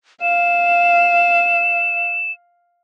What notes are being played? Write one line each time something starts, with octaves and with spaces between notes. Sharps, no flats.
F5 E7